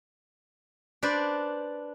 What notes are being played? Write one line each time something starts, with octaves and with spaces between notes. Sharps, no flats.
D4 B4 C5 D5